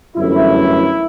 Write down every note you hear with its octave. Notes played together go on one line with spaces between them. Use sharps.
G1 F#2 E3 A3 E4